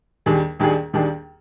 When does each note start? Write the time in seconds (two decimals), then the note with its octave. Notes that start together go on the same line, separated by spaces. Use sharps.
0.26 D#2 D#3 G3 D4 G#4
0.60 D#2 D#3 G3 D4 G#4
0.94 D#2 D#3 G3 D4 G#4